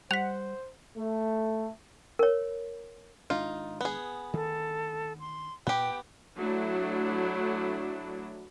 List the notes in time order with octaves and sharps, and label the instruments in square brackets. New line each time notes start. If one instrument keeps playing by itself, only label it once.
[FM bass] G3 [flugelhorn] C5 [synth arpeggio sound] F#5 [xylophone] B6 F7
[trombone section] A3
[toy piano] A#4 C#5
[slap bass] G#1 G#3 D4 [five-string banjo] D#4 F4
[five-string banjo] B3 G#4
[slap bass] D2 D#3 [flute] A4
[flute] C6
[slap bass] A#2 [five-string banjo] B3 G4 [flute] G5
[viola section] F#3 A3 D4 E4